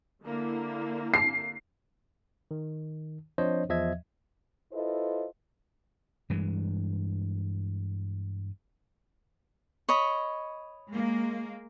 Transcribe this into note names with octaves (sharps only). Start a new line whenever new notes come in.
D3 A#3 E4
C7
D#3
F3 C4 D4 C5 C#5 D#5
E2 F3 D#5 E5 G#6
E4 F4 A4 B4 C5 D#5
G2 E3 G#3
C#5 D#5 B5
G#3 A#3